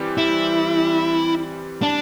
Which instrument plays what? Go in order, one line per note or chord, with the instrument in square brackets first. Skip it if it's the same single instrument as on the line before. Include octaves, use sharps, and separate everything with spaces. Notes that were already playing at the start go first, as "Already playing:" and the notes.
Already playing: [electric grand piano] E3 G3 C4 G4
[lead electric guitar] E4
D4